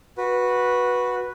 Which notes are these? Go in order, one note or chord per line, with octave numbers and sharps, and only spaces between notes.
F#4 B4